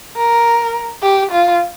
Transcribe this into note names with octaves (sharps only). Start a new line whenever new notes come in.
A#4
G4
F4